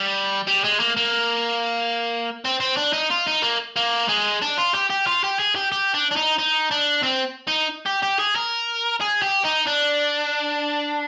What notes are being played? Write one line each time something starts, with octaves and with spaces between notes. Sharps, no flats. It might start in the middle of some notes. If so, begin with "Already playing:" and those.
Already playing: G3
G3
G#3
A#3
A#3
C4
C4
D4
D#4
F4
D#4
A#3
A#3
G#3
D4
F4
G4
G4
F4
G4
G#4
G4
G4
D4
D4
D#4
D#4
D4
C4
D#4
G4
G4
G#4
A#4
G#4
G4
D#4
D4